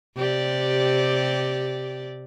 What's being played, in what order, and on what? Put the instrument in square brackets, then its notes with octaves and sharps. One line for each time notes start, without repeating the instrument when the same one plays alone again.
[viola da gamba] C3 G4 D5